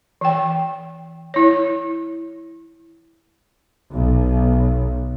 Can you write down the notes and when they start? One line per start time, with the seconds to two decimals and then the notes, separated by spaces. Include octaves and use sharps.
0.21 E3 G5
1.34 E4 C#5
3.92 B1